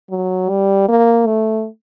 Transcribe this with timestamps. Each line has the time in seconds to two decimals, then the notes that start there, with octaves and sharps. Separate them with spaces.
0.10 F#3
0.49 G3
0.88 A#3
1.26 A3